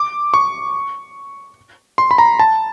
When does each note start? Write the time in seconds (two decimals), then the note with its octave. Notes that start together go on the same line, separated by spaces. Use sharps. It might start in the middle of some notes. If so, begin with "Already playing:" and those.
Already playing: D6
0.34 C#6
1.98 C6
2.11 B5
2.18 A#5
2.39 A5